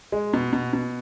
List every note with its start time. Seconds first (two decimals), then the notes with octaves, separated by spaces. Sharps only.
0.12 G#3
0.34 B2
0.53 B2
0.73 B2